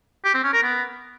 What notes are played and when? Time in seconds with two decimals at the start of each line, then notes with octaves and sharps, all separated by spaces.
0.24 G4
0.34 C4
0.44 C#4
0.53 A#4
0.63 B3